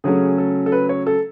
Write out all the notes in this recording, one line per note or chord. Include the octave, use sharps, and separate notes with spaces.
C#3 F#3 A3 C#4 G#4
A4
A4
B4
C#5
A4